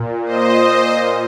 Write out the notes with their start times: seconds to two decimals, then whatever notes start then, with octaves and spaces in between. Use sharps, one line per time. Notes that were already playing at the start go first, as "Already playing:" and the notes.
Already playing: A#2
0.25 C5 D#5